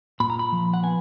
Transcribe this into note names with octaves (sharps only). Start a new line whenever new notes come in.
A#2 B5
A#5
B5
F3
F#5
B3 G#5